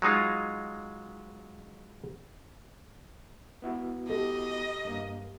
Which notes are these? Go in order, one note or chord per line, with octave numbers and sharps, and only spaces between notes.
F#3 G#3 D#4 F4
B3 E4 F#4
G4 A4 D#5
G2 A#3